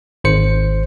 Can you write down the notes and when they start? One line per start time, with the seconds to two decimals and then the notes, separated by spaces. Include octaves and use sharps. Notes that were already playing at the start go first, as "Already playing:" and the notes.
0.24 G#1 C5 C#7